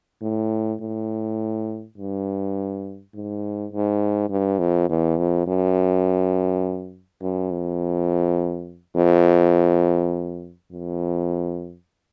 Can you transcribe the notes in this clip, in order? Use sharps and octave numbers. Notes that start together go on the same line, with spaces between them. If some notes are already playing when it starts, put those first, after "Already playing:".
A2
A2
G2
G#2
G#2
G2
F2
E2
F2
F#2
F#2
F2
F2
F2